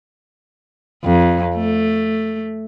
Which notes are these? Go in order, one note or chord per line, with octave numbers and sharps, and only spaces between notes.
F2
A3